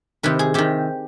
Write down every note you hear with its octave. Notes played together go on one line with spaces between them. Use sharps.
C3 D#3 B4
G#4
C3 D#3 G4